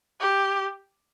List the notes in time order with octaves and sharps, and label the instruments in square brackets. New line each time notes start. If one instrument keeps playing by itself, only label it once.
[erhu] G4